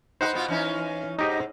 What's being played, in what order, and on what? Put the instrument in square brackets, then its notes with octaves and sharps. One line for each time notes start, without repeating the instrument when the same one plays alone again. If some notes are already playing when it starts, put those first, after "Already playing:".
[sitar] D#4 F#4 B4 [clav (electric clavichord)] C5 F#5
[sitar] B2 B3 F4
E3 C#4 D#4
[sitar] G#2 [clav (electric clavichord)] D#4 G4 D#5